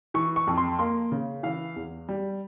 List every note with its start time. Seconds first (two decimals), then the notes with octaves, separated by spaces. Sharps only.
0.14 E3 C#6
0.36 C#6
0.47 F2
0.58 C6
0.79 A#3 C6
1.12 C#3
1.43 E3 F5
1.76 E2
2.09 G3